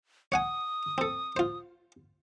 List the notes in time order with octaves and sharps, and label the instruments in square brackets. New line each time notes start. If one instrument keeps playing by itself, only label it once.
[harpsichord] C#5 F#5 G#5 [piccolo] D#6
[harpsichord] C4 A4
F4 C5